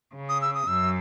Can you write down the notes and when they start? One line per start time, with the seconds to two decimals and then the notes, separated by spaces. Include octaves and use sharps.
0.15 C#3
0.29 D#6
0.42 E6
0.54 D#6
0.68 F#2 E6